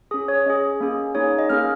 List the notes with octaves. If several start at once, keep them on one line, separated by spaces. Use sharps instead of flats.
C#4 G#4 D#6
C#5
C#4 G#4 D#5
A#3 C#4 G#4
A#3 D#4 G#4 C#5
D#5
A#3 C#4 G#4 F6